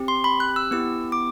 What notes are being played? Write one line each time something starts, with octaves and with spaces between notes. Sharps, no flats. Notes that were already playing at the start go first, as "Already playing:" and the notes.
Already playing: C4 G4
C6
B5
F#6
E6
B3 E4 G4 E6
D6